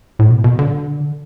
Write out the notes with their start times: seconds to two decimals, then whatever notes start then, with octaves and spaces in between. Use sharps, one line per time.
0.19 A2
0.30 B2
0.44 B2
0.59 D3